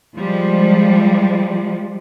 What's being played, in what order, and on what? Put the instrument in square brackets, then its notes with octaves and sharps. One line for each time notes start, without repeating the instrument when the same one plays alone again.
[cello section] F3 G3 G#3